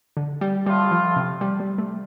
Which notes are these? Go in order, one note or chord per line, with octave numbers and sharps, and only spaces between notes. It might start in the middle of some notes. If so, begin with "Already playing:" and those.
D3
G3
A2 G3 A3 F4
F3
C3
G3
G3
A3